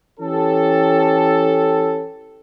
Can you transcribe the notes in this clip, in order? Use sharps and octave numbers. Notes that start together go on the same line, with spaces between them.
E3 C#4 G4 A4